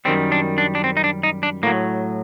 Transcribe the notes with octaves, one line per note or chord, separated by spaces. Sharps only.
F#2 D#3 G3 C4
D4
D4
D4
C4
D#4
D4
D#4
D4
A2 F#3 A#3